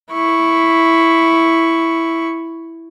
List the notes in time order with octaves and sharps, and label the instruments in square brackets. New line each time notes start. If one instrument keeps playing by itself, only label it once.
[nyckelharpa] E4 C#6